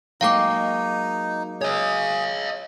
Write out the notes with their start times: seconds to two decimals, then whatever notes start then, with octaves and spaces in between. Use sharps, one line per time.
0.21 F#3 G#3 A#3 D#4 F5 G5 D6
1.61 G#4 C#5 D#5